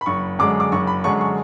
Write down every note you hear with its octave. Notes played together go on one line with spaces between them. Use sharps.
B5
F#1 C#6
F#2 D3 G#3 D6
D6
F#1 C#6
B5
F#2 D3 G#3 C#6
C#6